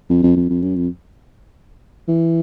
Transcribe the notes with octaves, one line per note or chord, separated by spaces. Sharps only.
F2
F2
F2
F2
F#2
F2
E3